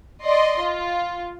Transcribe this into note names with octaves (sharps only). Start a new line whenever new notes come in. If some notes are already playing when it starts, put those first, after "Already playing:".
D5 D#5 C6
F4